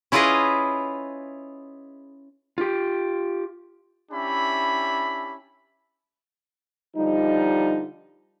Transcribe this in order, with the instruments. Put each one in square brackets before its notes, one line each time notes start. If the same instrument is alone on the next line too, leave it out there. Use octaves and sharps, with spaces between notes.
[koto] C#4 E4 F4 G#4 B4 D#5
[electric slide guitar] F4 G4
[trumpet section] C#4 D4 E4 G4 E5 B5
[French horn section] D3 F3 G3 D#4